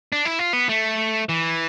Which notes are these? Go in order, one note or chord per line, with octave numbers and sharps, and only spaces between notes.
D4
E4
F4
B3
A3
E3